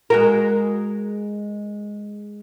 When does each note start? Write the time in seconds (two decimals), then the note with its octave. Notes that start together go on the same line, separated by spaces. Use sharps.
0.10 G#3 F#4 A#4